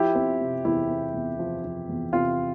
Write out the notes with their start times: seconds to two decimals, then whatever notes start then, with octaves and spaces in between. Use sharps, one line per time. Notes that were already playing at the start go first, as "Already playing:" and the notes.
Already playing: F3 E4 G4
0.15 C4
0.41 C3
0.65 E2 E4
0.89 C4
1.14 E2
1.39 F3
1.64 F3
1.89 E2
2.13 C3 F4